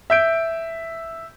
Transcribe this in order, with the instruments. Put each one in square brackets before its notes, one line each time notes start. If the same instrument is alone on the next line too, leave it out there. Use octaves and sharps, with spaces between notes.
[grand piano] E5 G6 D7